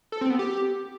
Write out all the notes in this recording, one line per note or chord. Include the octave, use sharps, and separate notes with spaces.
A4
C4
B3
G4